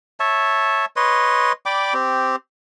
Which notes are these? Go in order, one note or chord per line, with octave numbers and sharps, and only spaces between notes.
C#5 E5 A5
B4 C#5 D#5 C6
D5 G5 B5 D6
C4 G4